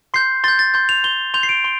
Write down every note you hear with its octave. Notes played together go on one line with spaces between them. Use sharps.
C6 G6 C7
C6 G6 A6
A6
C6 G6
F7
C6 G6 G7
C6 G6 F7
C7
D7
C6